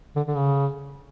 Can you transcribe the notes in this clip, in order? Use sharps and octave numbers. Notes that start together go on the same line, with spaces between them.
D3
D3
C#3